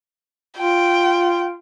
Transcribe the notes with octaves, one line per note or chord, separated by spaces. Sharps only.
F4 G5